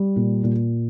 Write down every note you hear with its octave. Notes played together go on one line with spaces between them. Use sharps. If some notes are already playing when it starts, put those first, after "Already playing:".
Already playing: G3
A#2
A#2